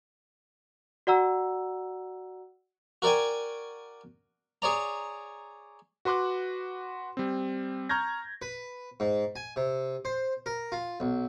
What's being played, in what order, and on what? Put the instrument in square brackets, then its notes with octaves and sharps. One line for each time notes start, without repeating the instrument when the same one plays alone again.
[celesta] F#4 D5 F#5 A#5 E6
[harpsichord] F#4 A#4 D5 G5 G#5
G#4 C#5 D5 A#5
[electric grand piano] F#4 B4 C6 D6 F#6
G3 C4
A#5 C#6 F6 G6 G#6 A#6
[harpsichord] B4
G#2
G#5
C3
C5
A#4
F4
B1